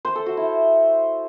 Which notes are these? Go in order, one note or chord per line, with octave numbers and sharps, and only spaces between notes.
C5
A4
F#4
E4